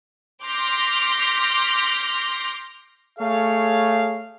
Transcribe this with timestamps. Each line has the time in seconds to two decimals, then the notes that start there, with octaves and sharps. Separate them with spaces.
0.43 C6 D6 F6 G6 A#6 B6
3.18 A3 G#4 C#5 F5